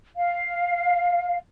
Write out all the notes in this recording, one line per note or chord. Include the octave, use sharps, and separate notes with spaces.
F5